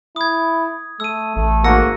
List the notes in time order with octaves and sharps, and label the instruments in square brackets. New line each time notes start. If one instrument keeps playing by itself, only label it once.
[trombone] E4 [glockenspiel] D#6 G#6
[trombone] A3 [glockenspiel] E6 D#7
[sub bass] A1 [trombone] A3
[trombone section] G#2 A#3 F#4 [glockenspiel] E6 A#6 C#7